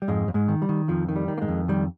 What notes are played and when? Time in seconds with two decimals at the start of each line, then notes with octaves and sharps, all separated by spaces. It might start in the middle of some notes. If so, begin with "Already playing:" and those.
0.02 G3
0.08 F2 G#2 G#3
0.28 F2
0.34 G#2 G#3
0.48 D#3
0.62 G3
0.69 D#3
0.88 F2 F3
1.08 D#3
1.16 G3
1.28 D#3
1.38 A#3
1.41 G#2 G#3
1.48 F2
1.68 D#3 G3